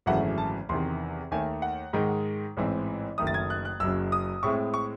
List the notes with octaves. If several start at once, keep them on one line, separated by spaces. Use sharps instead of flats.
G#1 F#2 C#3 E3 A3 F#5
A5
E2 C3 D#3 C6
D#2 D#3 A3 G#5
F#5
G#2 D#3 G#3 D#4
A1 G#2 E3 C4 E4
F#1 F#2 D#3 A3 D#6
A6
G#6
F#6
F#6
F#1 F#2 C#3 F#3 E6
D#6
A2 G#3 C4 E4 C#6
C#6